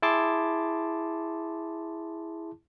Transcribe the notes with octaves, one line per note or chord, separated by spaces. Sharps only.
E4 G#4 A5 C6 D6